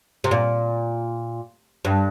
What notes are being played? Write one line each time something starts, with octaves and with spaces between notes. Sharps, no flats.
C3
A#2
G2